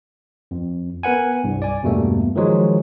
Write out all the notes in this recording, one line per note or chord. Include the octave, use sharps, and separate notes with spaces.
F2
B3 A#4 B4 F#5 G#5
C2 G2
D5 G#5
E2 G2 B2 G3 A3 A#3
D#3 F3 F#3 G#3